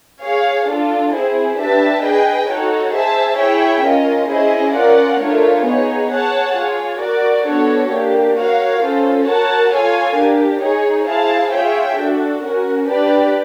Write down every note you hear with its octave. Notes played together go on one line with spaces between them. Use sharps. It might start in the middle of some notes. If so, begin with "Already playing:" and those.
G#4 C#5 F5
D4 F4 A4
C4 E4 G#4 C5
D4 G4 B4 E5 A5
G#4 B4 D#5 G5
D#4 F#4 A4 C#5
G#4 C5 E5 A5
E4 G#4 C#5 E5 G5
C#4 F4 A#4 D#5
C#4 E4 G#4 C5 D#5
C#4 F4 A#4 D5 F#5
A3 D4 F4 A#4 C#5
B3 D#4 G#4 C#5
G#4 C#5 F#5 A5
F4 G#4 C#5
F#4 A#4 D5
B3 D4 F#4 A4 C#5
A#3 D4 G4
F#4 A#4 C#5 F5
C#4 F4 A4 C5
F#4 A#4 C#5 F#5 A5
F4 A4 C#5 F5 G#5
D4 G4 A#4
D#4 G#4 C#5
E4 G#4 C5 F5 A5
F4 G#4 C#5 E5 G5
D4 F#4 A4
C#4 F#4 A#4
D4 G4 B4 D5